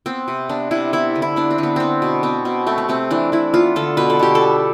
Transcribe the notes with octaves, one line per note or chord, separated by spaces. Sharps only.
B3 C4
C3
B3 D4
C3 E4
B3 E4
D3
E4
B3 D4
C4
D3 B3
B3 C4
B2
B3 C4
B2
A3 C4
B3
C3 C4
E3 D4
E3 E4
B3 F4
D3 A4
B2 B4
A4
B2 G4
A4
G3